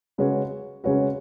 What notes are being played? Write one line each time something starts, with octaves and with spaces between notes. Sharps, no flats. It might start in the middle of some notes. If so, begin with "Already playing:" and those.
C#3 G#3 C#4 F#4 B4
C#3 G#3 C#4 F#4 B4